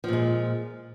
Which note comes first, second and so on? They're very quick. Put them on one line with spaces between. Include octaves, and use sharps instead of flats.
F3 A#2 G#3